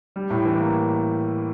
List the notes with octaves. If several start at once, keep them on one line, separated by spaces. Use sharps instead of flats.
G3
A2
E3
A#3